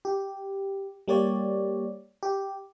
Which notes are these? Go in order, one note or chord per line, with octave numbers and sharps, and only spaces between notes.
G4
G3 A#3 G4 C#5 D5
G4